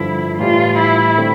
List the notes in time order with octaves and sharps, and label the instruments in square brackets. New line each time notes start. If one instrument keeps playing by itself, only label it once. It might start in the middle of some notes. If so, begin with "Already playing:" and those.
Already playing: [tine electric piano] G2 D3 F3 [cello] E4
[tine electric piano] A2 E3 G3 [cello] F4
[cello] E4
[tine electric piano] D3 A3 C4